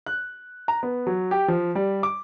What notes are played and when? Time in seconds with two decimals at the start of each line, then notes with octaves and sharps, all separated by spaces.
0.06 F#6
0.68 A#5
0.83 B3
1.07 F#3
1.31 G4
1.48 F3
1.75 G3
2.03 D6